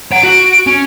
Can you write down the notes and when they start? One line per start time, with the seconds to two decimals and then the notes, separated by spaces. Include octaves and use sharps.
0.11 C#5 F#5 D7
0.24 F#4
0.67 C#4